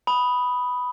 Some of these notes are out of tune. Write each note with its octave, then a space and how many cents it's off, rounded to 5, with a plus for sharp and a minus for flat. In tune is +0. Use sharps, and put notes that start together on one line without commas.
B5 +0 D#6 +0